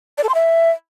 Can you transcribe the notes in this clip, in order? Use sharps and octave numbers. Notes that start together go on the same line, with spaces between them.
D5
A4
C6
E5